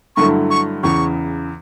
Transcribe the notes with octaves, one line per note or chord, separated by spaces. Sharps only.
G2 D3 F#3 A3 E4 C#6
C#6
E2 C#3 E3 C#6